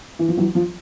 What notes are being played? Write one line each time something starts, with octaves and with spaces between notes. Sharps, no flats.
E3
F3
E3 F#3
F3